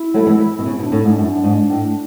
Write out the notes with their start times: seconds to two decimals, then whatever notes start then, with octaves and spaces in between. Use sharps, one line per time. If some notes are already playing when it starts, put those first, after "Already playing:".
Already playing: E4
0.14 F#3 A3
0.26 E3 G#3
0.59 B2
0.66 C#3 E4
0.79 B2
0.83 D4
0.92 A2
1.01 E4
1.05 G#2
1.09 D4
1.18 F#2
1.24 D4
1.44 G#2
1.70 A2